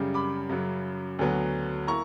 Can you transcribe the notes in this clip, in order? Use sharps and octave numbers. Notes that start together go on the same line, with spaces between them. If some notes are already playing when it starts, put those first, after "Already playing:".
Already playing: F#2 C#3 G3
B5 D6
F#2 C#3 F#3
D2 D3 F#3 B3
A#3 E4 A#5 C#6